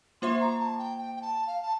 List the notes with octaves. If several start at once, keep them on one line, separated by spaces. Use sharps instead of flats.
A#3 F4 C5 E5 C6
A#5
A5
G5
G5
G5
A5
F5
A5